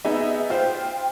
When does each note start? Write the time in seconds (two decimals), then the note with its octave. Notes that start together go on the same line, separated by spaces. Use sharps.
0.05 B3 D#4 G#4 E5
0.50 F4 C5 G5